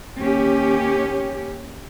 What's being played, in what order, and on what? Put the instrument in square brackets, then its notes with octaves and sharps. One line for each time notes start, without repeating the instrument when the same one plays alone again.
[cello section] D#2 C#4 G4